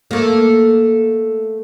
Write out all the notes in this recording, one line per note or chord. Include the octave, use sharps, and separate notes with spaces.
A3 A#3